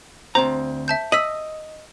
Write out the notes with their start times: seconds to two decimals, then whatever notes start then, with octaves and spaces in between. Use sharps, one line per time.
0.35 D2 C4 C5 A#5
0.88 E5 A5 G6
1.12 D#5 E6 B6 F#7